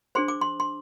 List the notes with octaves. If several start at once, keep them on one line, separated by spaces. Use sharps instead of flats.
D4 G#4 C5 C6
D6
C6
C6